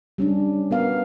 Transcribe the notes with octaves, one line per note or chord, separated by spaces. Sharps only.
G3 C#4 D4
B3 A#4 F5